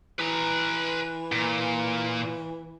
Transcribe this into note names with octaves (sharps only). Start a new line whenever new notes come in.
E3 B4 A#5
A#2